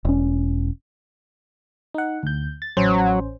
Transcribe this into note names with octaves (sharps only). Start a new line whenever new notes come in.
E1 C#4
D#4 F#5
D2 G6
A6
A1 F#3 C#4 C5